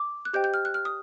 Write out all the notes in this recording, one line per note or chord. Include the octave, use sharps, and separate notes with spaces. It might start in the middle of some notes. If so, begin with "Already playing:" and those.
Already playing: D6
F#6
G4 C5 D#5 G5 G6
G6
F6
F#6
F6
D#6